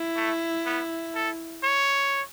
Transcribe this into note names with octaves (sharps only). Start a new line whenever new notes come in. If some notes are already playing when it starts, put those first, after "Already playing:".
Already playing: E4
A3
B3
A4
C#5